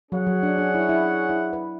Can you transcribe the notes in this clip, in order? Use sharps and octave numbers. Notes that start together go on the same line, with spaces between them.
F#3 C#4 G#4 C#5 F#5
F#3
D4
D4
E4
E4
E4
B4